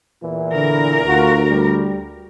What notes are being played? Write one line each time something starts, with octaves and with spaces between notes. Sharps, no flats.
E2 A#2 E3
D3 A#4
D2 F4 F#4
G3